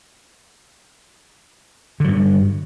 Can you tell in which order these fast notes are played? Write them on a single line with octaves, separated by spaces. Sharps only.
D3 F#3 G2